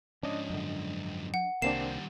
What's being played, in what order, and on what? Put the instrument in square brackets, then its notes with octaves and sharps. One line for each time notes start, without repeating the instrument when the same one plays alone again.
[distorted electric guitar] G#2 F3 [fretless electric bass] C#4 [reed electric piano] D4 D#5
[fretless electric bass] F#2 D3
[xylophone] F#5
[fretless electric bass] C2 [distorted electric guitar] D#3 G3 [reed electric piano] A#3 C4 D4 [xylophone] C7 E7